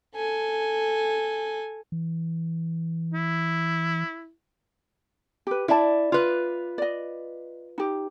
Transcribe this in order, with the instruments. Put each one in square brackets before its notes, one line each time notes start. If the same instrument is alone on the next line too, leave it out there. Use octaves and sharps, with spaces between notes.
[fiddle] A4 G#5
[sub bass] E3
[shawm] E4
[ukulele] G4 B4
[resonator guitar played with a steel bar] E4 D5 [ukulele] E5 A5
[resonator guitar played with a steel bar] F4 B4
[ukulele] D5 D#5
D#4 G4